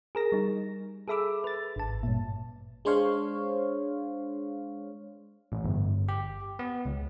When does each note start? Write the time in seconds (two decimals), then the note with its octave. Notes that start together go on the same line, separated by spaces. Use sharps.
0.15 G#4 A#4 A#6
0.32 G3 D#4
1.08 G#4 A4 E5 B5 D6 E6
1.44 B4 A6
1.76 G#1 A5
2.03 G2 A#2
2.85 G#3 D4 C5 C#5 F5
5.52 A1
5.64 G1
6.09 G4
6.59 B3
6.85 C#2